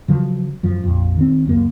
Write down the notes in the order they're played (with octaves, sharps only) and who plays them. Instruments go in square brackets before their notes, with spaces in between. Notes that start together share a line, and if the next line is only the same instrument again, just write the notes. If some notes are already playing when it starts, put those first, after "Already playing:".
[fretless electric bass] C#3 F3 F#3
F#2 F3
A#1 F2
D#3 C4
C#2 F#2 A#3